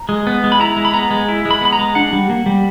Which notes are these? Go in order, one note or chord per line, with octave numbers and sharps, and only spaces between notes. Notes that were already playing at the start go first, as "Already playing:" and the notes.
Already playing: A#5
G#3
B3
G#3
B5
E4 A#5
G#3
B5
B3 A#5
G#3
E4
G#3
B5
B3 B5
A#5
G#3
D4 F#5
G3
A#3
G3